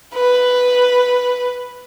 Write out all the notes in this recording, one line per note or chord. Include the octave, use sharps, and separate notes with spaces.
B4